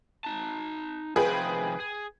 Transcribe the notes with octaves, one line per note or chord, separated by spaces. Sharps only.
D#4 A5
C3 D#3 F3 G#4 B4 G5
G#4